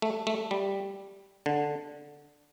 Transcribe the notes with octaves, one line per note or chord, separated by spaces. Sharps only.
A3
A3
G3
D3